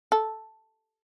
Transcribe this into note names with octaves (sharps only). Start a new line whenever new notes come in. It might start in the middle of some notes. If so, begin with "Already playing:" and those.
A4